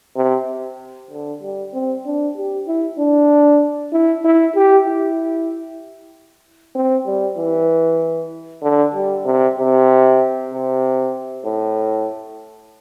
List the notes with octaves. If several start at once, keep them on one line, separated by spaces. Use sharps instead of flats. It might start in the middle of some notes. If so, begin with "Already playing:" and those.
C3
D3
G3
C4
D4
G4
E4
D4
E4
E4
G4
E4
C4
G3
E3
D3
G3
C3
C3
C3
A2